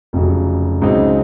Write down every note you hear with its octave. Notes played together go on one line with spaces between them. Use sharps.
F1 F2 C#3 F#3
C#2 C#3 F#3 C4 D#4